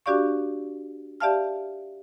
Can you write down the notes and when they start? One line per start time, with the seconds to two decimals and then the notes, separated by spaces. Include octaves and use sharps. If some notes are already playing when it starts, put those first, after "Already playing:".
0.06 D4 F#4 G4 D5 F5 C#6
1.20 G4 D5 E5 F5 A5 F6